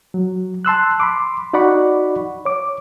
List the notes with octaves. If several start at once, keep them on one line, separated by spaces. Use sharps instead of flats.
F#3
A5 C6 E6 F#6
B5 C6 D6
D#4 F#4 D5 F#5 B5 C#6
C#5 D6